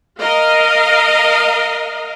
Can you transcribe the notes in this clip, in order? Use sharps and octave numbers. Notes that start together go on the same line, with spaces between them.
A#4 D#5 F5